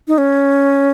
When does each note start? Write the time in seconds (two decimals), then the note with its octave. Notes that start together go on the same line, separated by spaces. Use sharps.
0.08 D#4
0.18 C#4